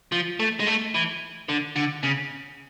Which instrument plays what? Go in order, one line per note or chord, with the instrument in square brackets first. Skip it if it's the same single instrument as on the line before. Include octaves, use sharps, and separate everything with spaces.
[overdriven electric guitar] F3
A3
G#3
A3
E3
D3
D3
C#3